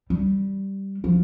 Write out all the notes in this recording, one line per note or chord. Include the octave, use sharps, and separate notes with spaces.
G3
F3